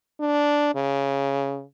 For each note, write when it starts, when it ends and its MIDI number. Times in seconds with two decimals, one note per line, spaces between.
0.20 0.74 62
0.75 1.63 49